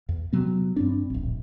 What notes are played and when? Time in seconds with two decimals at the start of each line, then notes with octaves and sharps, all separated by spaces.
0.09 E2
0.33 C3 F#3 B3
0.76 G2 C4 D4
1.10 D1 A#1